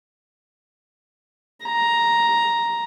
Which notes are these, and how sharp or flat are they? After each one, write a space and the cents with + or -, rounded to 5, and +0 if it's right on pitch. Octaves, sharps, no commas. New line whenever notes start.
A#5 +5